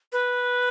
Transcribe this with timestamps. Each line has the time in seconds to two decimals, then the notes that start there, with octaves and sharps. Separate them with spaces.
0.12 B4